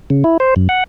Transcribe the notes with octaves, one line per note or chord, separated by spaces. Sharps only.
C#3
E4
C5
F#2
F#5